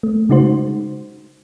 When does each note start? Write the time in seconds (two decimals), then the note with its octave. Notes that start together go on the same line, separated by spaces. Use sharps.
0.03 A3
0.29 C#3 G#3 D#4 F#4 C5